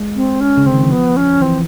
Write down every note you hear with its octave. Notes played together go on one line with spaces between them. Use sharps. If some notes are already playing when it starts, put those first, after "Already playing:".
Already playing: G#3
C4
C#4
C#3
D3 C4
D#3
E3
F3 B3
C#4
E3 C4